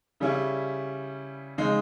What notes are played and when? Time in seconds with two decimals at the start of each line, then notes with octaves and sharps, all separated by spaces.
0.20 C#3 G3 C#4 E4
1.58 C#3 G#3 D#4